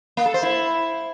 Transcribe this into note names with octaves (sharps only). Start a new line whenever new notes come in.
A#3
A4
C5
E4